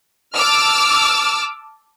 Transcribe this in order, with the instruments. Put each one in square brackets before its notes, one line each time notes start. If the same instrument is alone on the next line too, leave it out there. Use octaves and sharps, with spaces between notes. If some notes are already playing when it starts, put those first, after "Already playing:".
[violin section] A5 D6 E6 F6